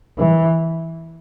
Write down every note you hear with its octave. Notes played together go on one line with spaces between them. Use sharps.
E3